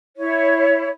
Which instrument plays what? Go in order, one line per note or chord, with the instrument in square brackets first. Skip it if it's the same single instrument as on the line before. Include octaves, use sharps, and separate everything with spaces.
[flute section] E4 C#5